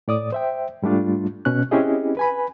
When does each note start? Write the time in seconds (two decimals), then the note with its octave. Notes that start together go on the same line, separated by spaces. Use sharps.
0.08 A2 D5 D#6
0.32 C5 E5 G5
0.82 G#2 G3 A3 D4 F4
1.45 B2 C#4 F#6
1.71 C4 C#4 E4 G4 G#4 D#5
2.17 B4 G#5 B5